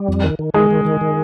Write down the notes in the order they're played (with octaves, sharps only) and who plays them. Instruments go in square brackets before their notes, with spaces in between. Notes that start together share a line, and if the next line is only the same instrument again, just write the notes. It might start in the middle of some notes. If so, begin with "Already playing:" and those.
Already playing: [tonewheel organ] G3
F2
D#3
D#3
[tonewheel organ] D#3 [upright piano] G#3
[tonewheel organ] D#3
D#3
D#3